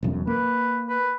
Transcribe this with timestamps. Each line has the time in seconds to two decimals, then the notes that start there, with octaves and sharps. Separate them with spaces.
0.03 E1 B1 F#2
0.27 A#3 B4
0.89 B4